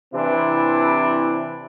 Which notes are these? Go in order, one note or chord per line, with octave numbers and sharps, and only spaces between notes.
C3 E3 C4 D4 E4